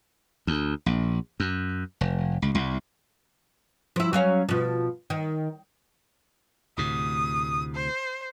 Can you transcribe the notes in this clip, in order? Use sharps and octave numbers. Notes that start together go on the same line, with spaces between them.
D2
A#1
F#2
F1
C#2
C2
F3 E4
F#3 C#4 F5
B2 F3
D#3
D2 A2 C3 D#6
C5